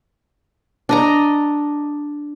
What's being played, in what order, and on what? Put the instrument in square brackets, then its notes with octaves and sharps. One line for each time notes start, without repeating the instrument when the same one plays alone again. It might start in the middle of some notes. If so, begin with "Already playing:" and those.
[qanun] D4 D#5 A#5